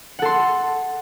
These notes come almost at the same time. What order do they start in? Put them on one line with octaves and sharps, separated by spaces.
F#5 A4 C6